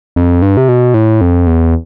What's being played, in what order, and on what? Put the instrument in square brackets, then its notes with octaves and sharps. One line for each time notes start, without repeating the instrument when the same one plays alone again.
[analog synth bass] F2
G2
C3
B2
A2
F2
E2